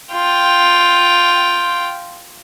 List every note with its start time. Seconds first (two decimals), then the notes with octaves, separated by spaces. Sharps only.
0.13 F4 G5